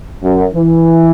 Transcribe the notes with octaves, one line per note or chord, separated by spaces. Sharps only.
F#2
E3